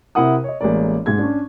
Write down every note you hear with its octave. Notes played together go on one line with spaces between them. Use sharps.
C3 E4 A#4 F#5 D#6
C#5 D#5
A1 G#3 A#3 D5
G#2 G#3 G#6
C#4 D4